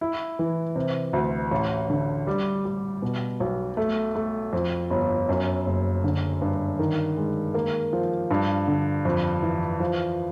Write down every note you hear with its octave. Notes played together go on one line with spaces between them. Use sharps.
E4
E3
C3
D2
A1
D3
G3
G3
B2
B1
A3
A3
F2
G1
F#2
F#1
D3
G2
D#3
G#3
A#3
F3
G2
D3
F2
E3
F3